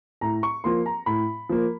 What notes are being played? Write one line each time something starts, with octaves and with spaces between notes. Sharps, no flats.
A2 A#5
C#6
F3 A#3 C6
A#5
A2 B5
F3 A#3